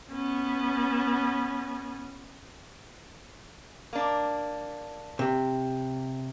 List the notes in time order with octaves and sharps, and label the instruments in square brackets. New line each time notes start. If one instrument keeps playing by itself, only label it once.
[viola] B3 C#4
[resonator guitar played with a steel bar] A#3 D4
[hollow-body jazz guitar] C3